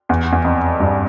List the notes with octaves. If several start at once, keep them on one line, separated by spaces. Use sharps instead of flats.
E2
E2
F2
G2